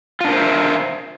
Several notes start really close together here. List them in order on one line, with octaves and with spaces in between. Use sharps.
F4 D4 A#4 C5 E5